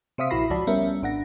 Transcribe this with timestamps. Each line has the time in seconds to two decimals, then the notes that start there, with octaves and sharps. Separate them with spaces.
0.18 C3 C5 E5 F5 D#6 B6
0.30 A#1 E4 F#4 B5 A#6 C7
0.50 C#2 F3 F#4 D5 A5 B5
0.67 G3 B3 C#4 A#4 E5
1.02 G#1 D4 F#5 A#6